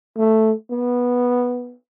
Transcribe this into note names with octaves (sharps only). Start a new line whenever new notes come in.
A3
B3